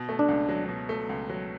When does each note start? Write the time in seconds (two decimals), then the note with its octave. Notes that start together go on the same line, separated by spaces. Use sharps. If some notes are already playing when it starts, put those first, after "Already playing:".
Already playing: B2
0.09 A3
0.19 D4
0.28 C#2
0.49 F#3
0.69 B2
0.89 A3
1.09 C#2
1.29 F#3